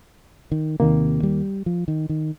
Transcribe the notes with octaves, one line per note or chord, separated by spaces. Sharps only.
D#3
D#2 C3 D#3 A#3
G3
F3
D#3
D#3